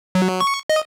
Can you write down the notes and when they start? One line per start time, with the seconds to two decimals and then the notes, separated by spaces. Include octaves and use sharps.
0.15 F#3
0.40 C#6
0.69 D#5